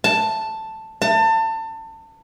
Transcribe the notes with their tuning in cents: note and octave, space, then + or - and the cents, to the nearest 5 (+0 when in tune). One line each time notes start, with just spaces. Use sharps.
A5 +5
A5 +30